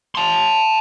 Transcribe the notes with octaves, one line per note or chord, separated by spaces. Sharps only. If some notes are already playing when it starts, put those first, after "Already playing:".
A5 C6